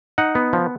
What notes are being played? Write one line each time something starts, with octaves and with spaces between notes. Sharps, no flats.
D#4 F#5
B3
F3